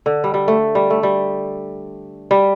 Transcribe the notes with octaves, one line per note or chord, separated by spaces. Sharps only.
D3
G3
G3
A3
G3
A3
G3
G3